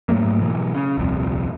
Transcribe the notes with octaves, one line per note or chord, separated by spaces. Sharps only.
G#2 F#3 A3 A#3
B2 E3 F#3
C#3
D#1 C2 F2